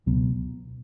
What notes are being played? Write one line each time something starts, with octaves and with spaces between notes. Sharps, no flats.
C#2 B2 F#3 B3